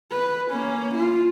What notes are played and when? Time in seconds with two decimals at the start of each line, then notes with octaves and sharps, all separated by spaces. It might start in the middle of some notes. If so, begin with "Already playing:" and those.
0.11 B4
0.51 A#3 C#4
0.95 F4